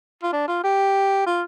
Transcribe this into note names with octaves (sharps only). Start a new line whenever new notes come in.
F4
D4
F4
G4
F4